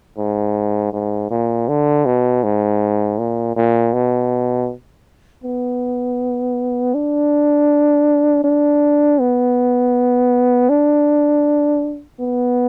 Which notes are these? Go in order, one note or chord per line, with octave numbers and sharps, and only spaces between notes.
G#2
G#2
A#2
D3
B2
G#2
A#2
A#2
B2
B3
D4
D4
B3
D4
B3